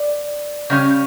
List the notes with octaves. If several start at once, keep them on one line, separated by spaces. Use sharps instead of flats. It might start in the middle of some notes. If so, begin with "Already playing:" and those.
Already playing: D5
C#3 G3 C#4